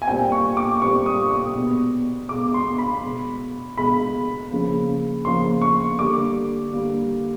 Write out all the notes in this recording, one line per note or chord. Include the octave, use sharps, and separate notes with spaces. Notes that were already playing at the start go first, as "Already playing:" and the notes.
G#5
A#2 G3 C4 G5
C#6
D6
A#2 G3 C4 C#6
D#6
D#6
B2 G#3 B3
B2 G#3 B3 D6
C6
B5
B2 G#3 B3
B2 G#3 B3 B5
C#3 F3 A#3
C#3 F3 A#3 C6
C#6
D3 G3 A#3 D6
D3 G3 A#3